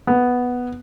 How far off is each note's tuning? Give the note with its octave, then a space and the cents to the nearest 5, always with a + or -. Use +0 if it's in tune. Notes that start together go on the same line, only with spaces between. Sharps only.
B3 +0